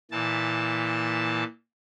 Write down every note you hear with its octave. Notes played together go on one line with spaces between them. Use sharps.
A#2 E3 A5